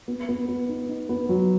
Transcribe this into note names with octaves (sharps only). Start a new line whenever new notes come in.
B3
B3
B3
D#4
D#4
B3
F#3